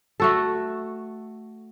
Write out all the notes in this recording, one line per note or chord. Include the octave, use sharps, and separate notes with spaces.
A3 F#4 A4